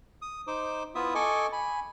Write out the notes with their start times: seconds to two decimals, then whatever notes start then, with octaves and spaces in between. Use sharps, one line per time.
0.22 D#6
0.47 D#4 C5 D6
0.95 B3 E4 F4 E5 D#6
1.15 A4 D#5 G#5 C#6 D6
1.52 G#5 B5